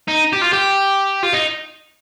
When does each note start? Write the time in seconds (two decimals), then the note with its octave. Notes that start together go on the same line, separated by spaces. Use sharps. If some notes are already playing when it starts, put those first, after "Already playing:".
0.08 D#4
0.33 G4
0.42 F4
0.53 G4
1.23 F4
1.33 D#4